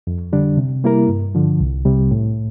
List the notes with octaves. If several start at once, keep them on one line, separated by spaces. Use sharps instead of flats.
F2
D3 G3 D4
C3
G3 A#3 E4 A#4
G2
D3 F3
C2
C3 G3
A2